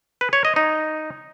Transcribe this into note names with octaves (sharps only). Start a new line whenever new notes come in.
B4
C#5
D#5
D#4